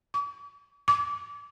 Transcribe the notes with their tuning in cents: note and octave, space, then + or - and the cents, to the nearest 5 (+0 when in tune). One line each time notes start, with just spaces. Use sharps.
D6 -45
D6 -25